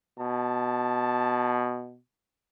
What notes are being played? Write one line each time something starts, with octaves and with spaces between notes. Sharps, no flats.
B2 A5